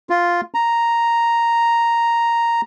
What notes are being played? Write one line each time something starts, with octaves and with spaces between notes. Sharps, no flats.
F4
A#5